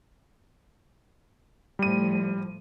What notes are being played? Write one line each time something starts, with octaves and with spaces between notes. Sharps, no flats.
A2 F3 G3 D#7